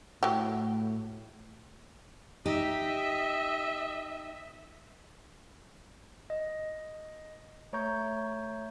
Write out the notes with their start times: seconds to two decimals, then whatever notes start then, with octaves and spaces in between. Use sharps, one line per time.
0.23 A2 F#3 G4
2.46 D#4 G4 D#5 E5
6.30 D#5
7.73 A3 C#5 A#5 C#6 G6